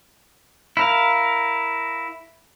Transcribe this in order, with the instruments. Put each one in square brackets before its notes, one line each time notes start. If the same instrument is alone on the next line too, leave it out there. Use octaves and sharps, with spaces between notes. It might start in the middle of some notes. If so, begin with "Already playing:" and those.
[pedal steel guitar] E4 A#4 F5